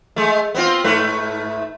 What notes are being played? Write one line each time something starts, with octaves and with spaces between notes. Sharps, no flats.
G#3 A3
B3 C4 F4
G#2 A3 B4